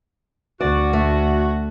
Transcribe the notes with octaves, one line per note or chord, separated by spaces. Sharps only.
D2 F#4 D5
A3